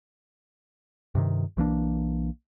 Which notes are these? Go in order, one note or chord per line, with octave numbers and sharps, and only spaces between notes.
G2 C3 D#3
B1 E3 A#3 D4